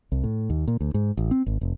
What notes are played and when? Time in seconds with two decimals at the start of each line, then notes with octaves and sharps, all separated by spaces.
0.12 C2
0.24 A2
0.50 D#2
0.68 A#2
0.81 D2
0.94 G#2
1.17 A1
1.31 C4
1.46 G#1
1.61 F1